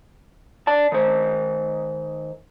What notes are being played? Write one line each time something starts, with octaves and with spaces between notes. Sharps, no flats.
D5 A5
D#3 C5